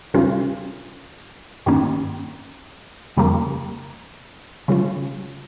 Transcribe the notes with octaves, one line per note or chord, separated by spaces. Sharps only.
C3 G3 C#4 F4
G2 D#3 A#3 C#4
F2 C#3 G3 A#3
C#3 G3 C#4 F4